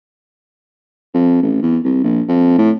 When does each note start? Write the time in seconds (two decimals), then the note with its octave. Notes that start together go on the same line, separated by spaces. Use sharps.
1.14 F2
1.43 A1
1.62 E2
1.85 C2
2.04 A#1
2.28 F2
2.58 A2